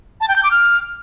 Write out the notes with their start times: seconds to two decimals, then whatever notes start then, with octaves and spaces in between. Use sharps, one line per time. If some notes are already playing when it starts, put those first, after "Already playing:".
0.21 A5
0.28 G5
0.36 G6
0.44 D6
0.51 F6